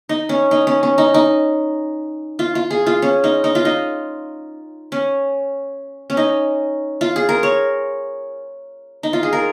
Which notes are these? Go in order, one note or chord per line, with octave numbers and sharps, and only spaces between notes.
D#4
C#4
D#4
C#4
C#4
D#4
D#4
F4
F4
G#4
F4
C#4
D#4
D#4
F4
D#4
C#4
C#4
D#4
F4
G#4
A#4
C#5
D#4
F4
G#4
A#4